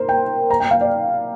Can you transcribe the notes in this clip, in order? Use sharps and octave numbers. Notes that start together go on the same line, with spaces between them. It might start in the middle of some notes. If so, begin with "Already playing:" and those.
Already playing: A#4 C5
G5
A#5
G5
F5
D5